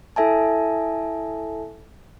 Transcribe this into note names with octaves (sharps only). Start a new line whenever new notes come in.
E4 A4 E5 G#5 A5